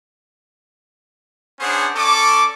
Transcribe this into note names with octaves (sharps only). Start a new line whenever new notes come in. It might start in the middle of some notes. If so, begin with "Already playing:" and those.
B3 C#4 D4 G#4 C5 F#5
C#4 A4 D5 C#6 D6